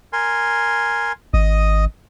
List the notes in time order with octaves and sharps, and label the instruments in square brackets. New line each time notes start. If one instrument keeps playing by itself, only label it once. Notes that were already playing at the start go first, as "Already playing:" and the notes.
[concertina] A#4 G#5 C6
[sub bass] G#1 [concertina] D#5 D#6